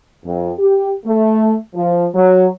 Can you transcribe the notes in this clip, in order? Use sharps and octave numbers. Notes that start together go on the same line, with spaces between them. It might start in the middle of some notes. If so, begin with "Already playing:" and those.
F2
G4
A3
F3
F#3